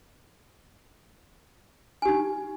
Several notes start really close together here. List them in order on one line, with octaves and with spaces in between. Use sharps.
G#5 G4 D#4